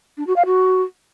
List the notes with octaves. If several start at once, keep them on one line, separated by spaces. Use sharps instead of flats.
D4
F#4
F5
F#4